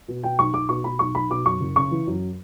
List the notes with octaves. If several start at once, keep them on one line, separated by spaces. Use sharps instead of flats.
B2
B2 G5
B1 C#6
B1 D6
B2 C#6
B2 B5
B1 C#6
B1 B5
B2 D6
F#2 C#6
F#1
C#3 C#6
E3
F#2